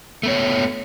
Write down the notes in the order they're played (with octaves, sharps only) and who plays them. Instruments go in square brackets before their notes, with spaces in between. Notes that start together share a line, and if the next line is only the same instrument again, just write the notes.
[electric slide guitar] A3 B3 C#5